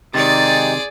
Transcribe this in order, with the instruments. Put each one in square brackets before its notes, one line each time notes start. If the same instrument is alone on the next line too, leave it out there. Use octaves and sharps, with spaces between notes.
[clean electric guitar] C3 D#3 [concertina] G#3 D#4 G4 [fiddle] G#4 D5 [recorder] A6